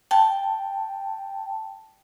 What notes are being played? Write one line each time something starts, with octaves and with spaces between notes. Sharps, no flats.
G5 A5